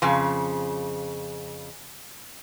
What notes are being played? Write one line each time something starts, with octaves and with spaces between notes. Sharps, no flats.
F2 C#3